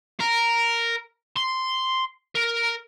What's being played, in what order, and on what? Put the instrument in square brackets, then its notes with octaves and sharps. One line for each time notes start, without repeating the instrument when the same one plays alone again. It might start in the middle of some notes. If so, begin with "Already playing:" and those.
[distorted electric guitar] A#4
C6
A#4